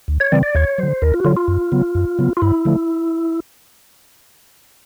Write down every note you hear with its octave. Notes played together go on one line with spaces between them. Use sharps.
D2
C#5
C#3 E3 G3 C4 D5
D5
D#2 C#5
D3 F#3 C5
D#2 A#4
F4
F#4
D3 F#3 F4
F4
F#2
C#3 F#3 B3
F#2
C#3 F#3 B3
F4
G2 E4
D3 F3 A3